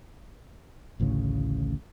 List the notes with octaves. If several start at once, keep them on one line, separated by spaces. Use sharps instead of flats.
A1 D2 A2 C#3